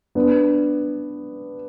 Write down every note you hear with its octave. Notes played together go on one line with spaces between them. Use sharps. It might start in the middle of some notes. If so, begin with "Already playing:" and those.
B3 D4